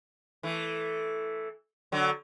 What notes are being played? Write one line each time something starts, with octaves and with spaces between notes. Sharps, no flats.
E3 A3
D3 F#3